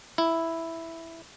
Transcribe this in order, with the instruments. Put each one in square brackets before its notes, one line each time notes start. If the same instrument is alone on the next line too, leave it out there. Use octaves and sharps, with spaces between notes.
[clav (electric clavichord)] E4